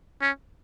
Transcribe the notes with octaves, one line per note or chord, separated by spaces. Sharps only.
C#4